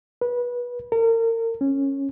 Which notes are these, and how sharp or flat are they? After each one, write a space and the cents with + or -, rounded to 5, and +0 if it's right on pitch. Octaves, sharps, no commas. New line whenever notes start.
B4 -25
A#4 -35
C#4 -15